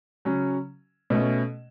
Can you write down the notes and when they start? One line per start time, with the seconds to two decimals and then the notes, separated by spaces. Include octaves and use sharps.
0.25 C#3 F#3 C#4
1.10 B2 A3 C#4